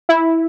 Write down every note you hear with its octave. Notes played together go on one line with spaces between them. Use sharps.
E4